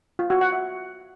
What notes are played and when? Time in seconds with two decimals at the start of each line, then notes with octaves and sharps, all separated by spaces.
0.19 F4
0.30 F#4
0.41 F#5
0.52 E5